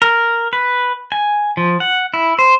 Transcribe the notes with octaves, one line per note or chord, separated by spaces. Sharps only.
A#4
B4
G#5
F3
F#5
E4
C5